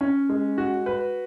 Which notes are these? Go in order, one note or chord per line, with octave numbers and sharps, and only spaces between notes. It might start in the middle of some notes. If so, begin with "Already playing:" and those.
C#4
G#3
F#4
B4